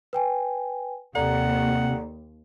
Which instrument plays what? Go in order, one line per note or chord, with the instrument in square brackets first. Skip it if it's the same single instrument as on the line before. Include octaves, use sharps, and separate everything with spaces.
[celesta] B4 G5 G#5
[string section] D#2 [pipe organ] C3 A#3 C4 [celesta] A4 D5 A#5 [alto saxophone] F#5